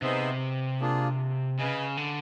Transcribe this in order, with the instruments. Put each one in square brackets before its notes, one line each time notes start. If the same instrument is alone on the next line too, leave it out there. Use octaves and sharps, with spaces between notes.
[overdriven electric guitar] C3 [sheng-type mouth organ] B3 D#4 G#4 C5 E5
[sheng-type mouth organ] A#3 D4 F4 G#4
[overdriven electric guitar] C#3 [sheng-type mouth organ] G#4 B4 D#5 G#5
[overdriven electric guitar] D3